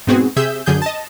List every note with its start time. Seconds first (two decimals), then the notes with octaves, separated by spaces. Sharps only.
0.07 G#2 B2 B3 C4 F#4 G#4
0.36 C3 G#4 E5 E6 G6
0.66 F#2 D3 G#4 G6
0.82 D#5 A5